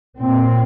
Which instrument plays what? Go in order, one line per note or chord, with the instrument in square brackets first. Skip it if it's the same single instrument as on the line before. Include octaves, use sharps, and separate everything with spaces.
[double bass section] A#2 C4